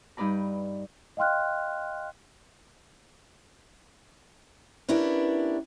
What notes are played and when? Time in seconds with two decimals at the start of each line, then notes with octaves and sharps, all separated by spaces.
0.17 G2 D#4 B4 D5 A#5
1.17 D#5 F5 G5 C6 F6 F#6
4.89 B3 C#4 D4 E4 G4 A#4